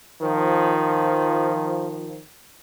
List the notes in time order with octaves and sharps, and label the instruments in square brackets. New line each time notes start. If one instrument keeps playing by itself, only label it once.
[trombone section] D#3 F3